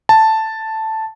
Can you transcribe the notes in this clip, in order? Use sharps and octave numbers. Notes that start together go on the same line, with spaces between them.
A5